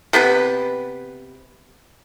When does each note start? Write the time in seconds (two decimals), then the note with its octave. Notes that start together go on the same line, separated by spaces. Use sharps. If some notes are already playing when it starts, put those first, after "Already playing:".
0.13 C3 B3 G4 B4